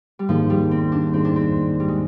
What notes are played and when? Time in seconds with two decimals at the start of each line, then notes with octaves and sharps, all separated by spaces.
0.19 G3
0.29 G#2 D#3 F3 A#3 D#4 G#4
0.50 G3
0.71 C4
0.92 D4
1.13 G#2 D#3 A#3 C4 D#4 G#4
1.25 D4
1.36 C4
1.80 G3
1.88 G#3